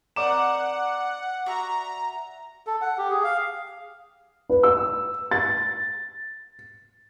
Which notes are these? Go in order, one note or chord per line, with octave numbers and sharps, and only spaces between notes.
C4 D#4 A#4 D5 F#5 D6 E7
F#4 E5 A#5
A4
F#5
G4
G#4
F5
B4
E6
A6